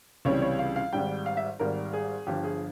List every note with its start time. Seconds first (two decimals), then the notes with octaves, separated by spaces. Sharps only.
0.25 C#2 C3 E3 G3 C#5
0.42 C#5
0.59 F5
0.76 F5
0.92 G#1 G#2 G3 G5
1.26 F5
1.37 E5
1.59 G#1 G#2 G3 A#4
1.93 G#4
2.27 G1 G2 F3 G4
2.44 G#4